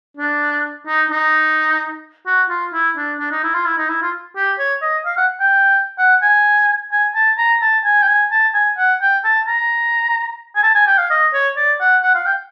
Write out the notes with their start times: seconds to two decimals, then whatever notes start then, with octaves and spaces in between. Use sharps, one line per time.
0.17 D4
0.87 D#4
1.11 D#4
2.26 F#4
2.49 F4
2.73 E4
2.97 D4
3.19 D4
3.31 D#4
3.43 E4
3.54 F4
3.66 E4
3.78 D#4
3.89 E4
4.02 F4
4.36 G4
4.59 C#5
4.82 D#5
5.05 F5
5.17 F#5
5.40 G5
5.98 F#5
6.22 G#5
6.92 G#5
7.15 A5
7.38 A#5
7.62 A5
7.84 G#5
8.02 G5
8.08 G#5
8.31 A5
8.54 G#5
8.78 F#5
9.01 G5
9.24 A5
9.47 A#5
10.55 G#5
10.63 A5
10.75 G#5
10.87 G5
10.98 F5
11.10 D#5
11.33 C#5
11.56 D5
11.80 F#5
12.02 F#5
12.14 F5
12.26 G5